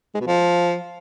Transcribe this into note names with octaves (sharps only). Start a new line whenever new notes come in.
G#3
B2
F3